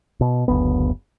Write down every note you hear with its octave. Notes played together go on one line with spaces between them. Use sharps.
B2
F#1 D2 B3